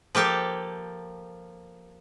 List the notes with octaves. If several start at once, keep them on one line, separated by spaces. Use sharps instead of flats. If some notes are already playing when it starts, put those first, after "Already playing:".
F3 A#3 G4 A4